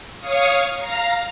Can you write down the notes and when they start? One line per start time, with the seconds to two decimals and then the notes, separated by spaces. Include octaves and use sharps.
0.19 C#5 F5 C#6 D#6
0.78 F5 A#5